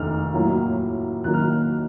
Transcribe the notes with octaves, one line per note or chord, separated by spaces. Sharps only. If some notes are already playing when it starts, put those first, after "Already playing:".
Already playing: F1 D#2 D#3 A3 D#4 F6
A2 F#3 A#3 F4
D#2 D#3 F#3 A#3 D#4 F#6
F6